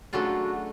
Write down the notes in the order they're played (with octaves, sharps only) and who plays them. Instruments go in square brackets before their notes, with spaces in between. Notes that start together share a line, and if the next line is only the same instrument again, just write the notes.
[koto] C#3 F#3 A3 D4 F4 [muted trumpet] F#4